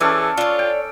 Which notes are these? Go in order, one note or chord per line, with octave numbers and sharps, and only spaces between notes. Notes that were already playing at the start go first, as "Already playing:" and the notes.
E3 C#4 G#4 A4 D5
D4 F4 C#5
G5